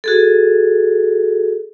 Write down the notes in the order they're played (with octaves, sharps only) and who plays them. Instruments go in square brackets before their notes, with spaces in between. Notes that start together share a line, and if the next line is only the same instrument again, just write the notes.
[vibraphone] F#4 G#4 A4